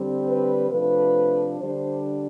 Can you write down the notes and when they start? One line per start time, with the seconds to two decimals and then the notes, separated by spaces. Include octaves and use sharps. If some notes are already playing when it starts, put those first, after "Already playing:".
Already playing: D3 G3 C4
0.26 B4
0.69 C3 F3 A3 D4 B4
1.59 D3 G3 D4 C5